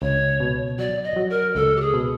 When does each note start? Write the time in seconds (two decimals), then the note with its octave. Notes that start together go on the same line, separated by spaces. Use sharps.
0.02 C#2 C#5
0.40 B2
0.79 F#3 D5
1.04 D#5
1.16 F#3
1.30 A#4
1.55 C#2 A4
1.77 G4
1.81 G#4
1.94 B2